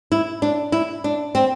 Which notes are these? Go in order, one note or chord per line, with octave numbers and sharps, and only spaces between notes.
E4
D4
E4
D4
C4